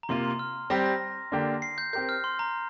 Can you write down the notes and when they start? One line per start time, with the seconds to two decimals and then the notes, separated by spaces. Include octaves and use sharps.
0.03 A#5
0.09 C3 A#3 F4 C6
0.24 C6
0.39 F6
0.70 G3 C4 G4 A#6
0.86 A#6
1.32 D3 A#3 D4 G4
1.62 C7
1.78 G6
1.93 C4 G4 A#4 G6
2.09 F6
2.24 C6
2.39 A#5